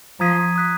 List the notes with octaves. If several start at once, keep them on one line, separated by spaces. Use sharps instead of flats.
F3 A#5 D#6 G#6 B6 D#7
D#6 F#6 B6